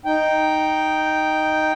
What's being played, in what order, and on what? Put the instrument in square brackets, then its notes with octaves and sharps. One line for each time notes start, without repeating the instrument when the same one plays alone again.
[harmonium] D#4 G5